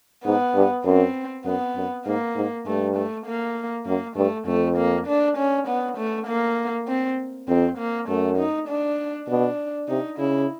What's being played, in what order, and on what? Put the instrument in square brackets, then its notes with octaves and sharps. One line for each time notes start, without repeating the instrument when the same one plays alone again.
[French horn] G#2 [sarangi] B3
[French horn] G2
[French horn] F#2 [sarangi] C4
[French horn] F#2 [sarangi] B3
[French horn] F#2
[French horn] G#2 [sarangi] A#3
[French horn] G#2
[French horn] G2 [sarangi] A3
[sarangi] A3
A#3
[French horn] F#2 [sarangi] A#3
[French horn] G2 [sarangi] A3
[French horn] F2 [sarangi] A3
[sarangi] A#3
D4
C#4
B3
A3
A#3
C4
[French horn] F2 [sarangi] C4
[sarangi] A#3
[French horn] F#2 [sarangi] A3
[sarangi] D#4
D4
[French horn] B2 [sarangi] D4
[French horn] C3 [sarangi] D#4
[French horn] C#3 [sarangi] E4